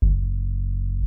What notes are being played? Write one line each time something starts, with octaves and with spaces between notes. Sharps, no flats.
F#1